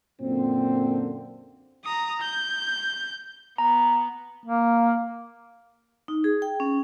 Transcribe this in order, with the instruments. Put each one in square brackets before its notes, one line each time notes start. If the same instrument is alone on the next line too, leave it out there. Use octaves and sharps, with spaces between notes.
[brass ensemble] F#2 A#2 D3 A#3 C4
[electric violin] A#5 D#6
G6
[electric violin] B3 [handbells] A#5
[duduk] A#3
[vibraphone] D#4
G#4
G5
C#4